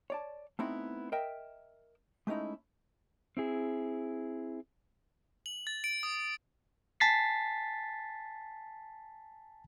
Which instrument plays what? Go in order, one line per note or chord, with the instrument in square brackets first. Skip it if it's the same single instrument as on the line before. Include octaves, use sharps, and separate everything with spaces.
[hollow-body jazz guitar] C#5 D5 A5
A3 B3 C4 D#4 E4
A#4 D#5 E5 G5
G#3 A3 C#4 D#4 E4
[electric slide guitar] C4 E4 G#4
[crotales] F#7
A6
D7
D#6
[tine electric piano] G#5 A5 A6 B6 C7